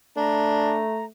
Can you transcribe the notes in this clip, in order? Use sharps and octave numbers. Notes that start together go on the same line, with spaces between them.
A3 D4 A#5